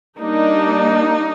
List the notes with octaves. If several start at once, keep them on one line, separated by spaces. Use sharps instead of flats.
G3 A#3 D4 D#4